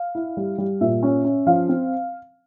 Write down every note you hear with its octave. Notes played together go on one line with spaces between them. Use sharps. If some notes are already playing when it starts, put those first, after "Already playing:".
Already playing: F5
E4
G3
G3
A#2 E5
C#4
C#4
F3 F5
C4